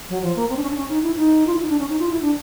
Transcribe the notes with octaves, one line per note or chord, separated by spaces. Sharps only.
F#3
F3
A#3
C4
D4
C#4
D4
C#4
D#4
E4
D#4
F4
E4
D#4
D4
C#4
D#4
F4
E4
D4